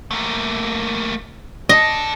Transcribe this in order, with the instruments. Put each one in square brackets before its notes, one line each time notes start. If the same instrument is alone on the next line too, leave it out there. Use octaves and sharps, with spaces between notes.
[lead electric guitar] A3 A#3
[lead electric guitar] D4 A4 [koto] D#5